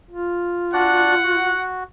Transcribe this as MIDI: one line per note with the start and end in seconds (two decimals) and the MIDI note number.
0.11 1.55 65
0.73 1.15 62
0.73 1.15 66
0.73 1.15 74
0.73 1.65 78
1.24 1.83 66